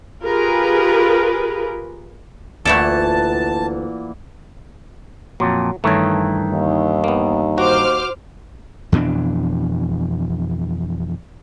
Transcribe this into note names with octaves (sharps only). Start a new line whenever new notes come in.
F4 G4 G#4 A#4 B4
D2 A#2 E3 A3 E4 A4 F#5 A5
F2 A#2 F#3
G2 D#3 E3 A3 C#5
D#2
A#3 B3
F#4 C5 D6 F6
F2 B2 E3 D4